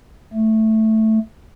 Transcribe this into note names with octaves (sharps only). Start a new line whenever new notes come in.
A3